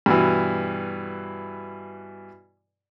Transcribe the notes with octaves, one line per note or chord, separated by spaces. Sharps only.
G2 B2 E3